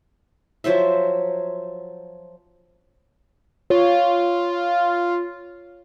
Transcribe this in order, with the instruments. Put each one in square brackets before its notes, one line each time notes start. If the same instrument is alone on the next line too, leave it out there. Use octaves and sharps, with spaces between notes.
[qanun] F3 F#3 C5 E5
[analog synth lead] F4 [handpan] C#5